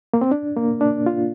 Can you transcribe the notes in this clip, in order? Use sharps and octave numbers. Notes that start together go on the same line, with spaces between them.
A#3
C4
D4
A#3
D4
F4